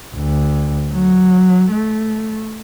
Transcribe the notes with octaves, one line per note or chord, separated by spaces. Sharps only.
D2
F#3
A3